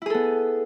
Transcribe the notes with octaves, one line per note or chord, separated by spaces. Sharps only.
B3 E4 G#4 A4